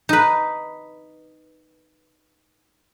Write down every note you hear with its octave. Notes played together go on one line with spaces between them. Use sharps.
D#4 B4